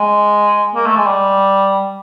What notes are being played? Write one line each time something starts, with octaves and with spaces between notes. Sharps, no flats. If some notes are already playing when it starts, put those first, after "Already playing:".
Already playing: G#3
A#3
A3
G#3
G3